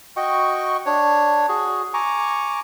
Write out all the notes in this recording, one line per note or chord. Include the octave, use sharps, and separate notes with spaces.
F#4 D#5 G5 C#6
D4 C#5
F#4 G#4
G#5 A#5 C#6 D6